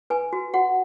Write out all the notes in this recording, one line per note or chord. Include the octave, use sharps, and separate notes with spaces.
B4 G#5
F#4
F#4 F#5